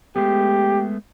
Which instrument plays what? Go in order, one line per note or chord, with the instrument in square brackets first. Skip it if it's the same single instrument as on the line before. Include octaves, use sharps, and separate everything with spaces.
[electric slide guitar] G#3 A3 B3 [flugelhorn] G4